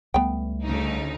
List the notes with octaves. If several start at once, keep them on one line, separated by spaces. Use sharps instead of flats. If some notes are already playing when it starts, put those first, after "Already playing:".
C#2 G3 A3 B3 G5
D2 C#3 D#4